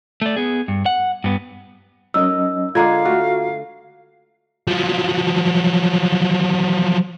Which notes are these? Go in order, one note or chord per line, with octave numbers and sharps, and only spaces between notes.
A3 D5
B3 G#4
G2
F#5
G2 B3
F#3 C#4 D#4 A#4 D#5 E6
D3 G#3 D4 F4 F5 A#5 G#6
A3 F#4 F6
F3 F#3